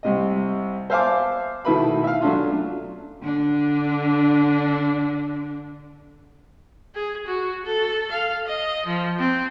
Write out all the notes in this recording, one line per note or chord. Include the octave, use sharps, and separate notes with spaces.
C2 C3 D#5
C5 E5 F5 G#5 A5 D6
B2 D#3 A3 E4 B4 B5
E5 F5
F#3 A3 C#4 D4 F4
D3 D4
G#4
F#4
A4
F5
D#5
F3
C4